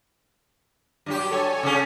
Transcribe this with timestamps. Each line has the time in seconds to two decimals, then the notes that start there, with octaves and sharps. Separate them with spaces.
1.06 G2 F#3 G4
1.31 A4 C#5 G#5
1.63 C#3 C#4